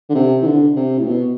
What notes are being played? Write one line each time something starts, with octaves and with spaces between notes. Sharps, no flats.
D3
C3
E3
D3
C3
A2
B2